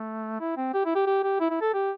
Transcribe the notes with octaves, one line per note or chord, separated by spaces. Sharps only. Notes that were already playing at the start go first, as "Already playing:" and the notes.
Already playing: A3
E4
C4
G4
E4
G4
G4
G4
E4
E4
A4
G4